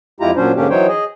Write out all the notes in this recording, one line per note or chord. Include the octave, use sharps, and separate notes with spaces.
F2 G#3 E4 F4 G4 A#5
A#2 F#3 C#4 D4 C5
G#2 D3 A#3 C#4 D4 G4
E3 F#3 D#4 C5 C#5 G5
G#4 D#5